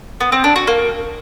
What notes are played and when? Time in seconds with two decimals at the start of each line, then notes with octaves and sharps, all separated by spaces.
0.20 B3
0.32 C4
0.44 D4
0.56 F#4
0.67 A#3